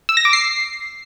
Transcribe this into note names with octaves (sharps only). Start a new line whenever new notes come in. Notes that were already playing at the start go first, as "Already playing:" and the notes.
E6
A#6
D6
C7